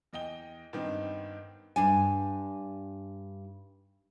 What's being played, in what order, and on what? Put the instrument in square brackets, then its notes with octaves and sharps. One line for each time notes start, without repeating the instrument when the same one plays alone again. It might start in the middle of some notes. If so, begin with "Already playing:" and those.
[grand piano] E2 D#5 G5 G7
G2 D#3 B3 C4 D#4
[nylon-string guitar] G2 D4 G#5